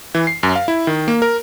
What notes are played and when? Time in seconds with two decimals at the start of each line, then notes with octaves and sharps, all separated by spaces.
0.15 E3
0.27 C7
0.43 F#2
0.56 F5
0.68 E4
0.87 D#3
1.08 A#3
1.22 A#4